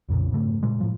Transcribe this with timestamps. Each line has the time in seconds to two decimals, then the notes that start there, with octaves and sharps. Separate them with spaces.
0.09 B1 F2 A#2 C#3
0.32 G#2 C#3 A3
0.63 A#2 G#3
0.80 A2 F3